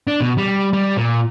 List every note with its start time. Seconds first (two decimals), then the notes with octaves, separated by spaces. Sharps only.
0.07 D4
0.21 B2
0.38 G3
0.73 G3
0.97 A#2